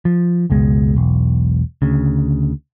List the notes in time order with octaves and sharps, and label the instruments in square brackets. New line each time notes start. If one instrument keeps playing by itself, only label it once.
[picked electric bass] F3
F#1 C#2 B2 G#3
E1 B1
D2 C#3